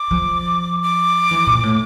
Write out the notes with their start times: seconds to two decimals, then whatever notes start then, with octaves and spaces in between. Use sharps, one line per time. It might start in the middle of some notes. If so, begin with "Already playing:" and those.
Already playing: D6
0.11 F3
0.83 D6
1.31 E3
1.47 A#2
1.63 A2